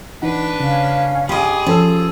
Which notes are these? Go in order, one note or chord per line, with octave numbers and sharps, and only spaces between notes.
E3 D4 D#4 B4 F#5
C#3 C#4 F5
G4 G#4 D#5 B5 C6
F3 C#4 A4 E6